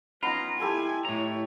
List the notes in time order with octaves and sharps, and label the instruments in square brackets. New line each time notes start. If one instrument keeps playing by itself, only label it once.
[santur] B3 D#4 B5 [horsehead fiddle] C#4 A#5 [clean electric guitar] F4
[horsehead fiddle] E4 G#5 [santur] G4 A4 C6
[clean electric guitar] A2 A#5 [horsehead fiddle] E4 C#5